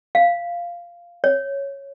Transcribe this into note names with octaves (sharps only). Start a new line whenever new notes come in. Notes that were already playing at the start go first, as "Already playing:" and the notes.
F5
C#5